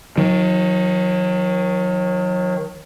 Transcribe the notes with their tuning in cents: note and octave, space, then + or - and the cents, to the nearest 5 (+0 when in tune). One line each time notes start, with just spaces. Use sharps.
D#3 +25 F#3 -30